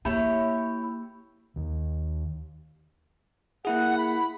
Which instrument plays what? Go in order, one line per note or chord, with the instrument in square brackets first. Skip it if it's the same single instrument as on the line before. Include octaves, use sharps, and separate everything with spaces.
[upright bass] A#3 [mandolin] E4 G4 C#5
[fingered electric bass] D#2
[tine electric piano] A#3 E4 G#4 [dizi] F#5
[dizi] B5